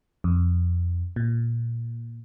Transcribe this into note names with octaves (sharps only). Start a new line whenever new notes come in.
F2
A#2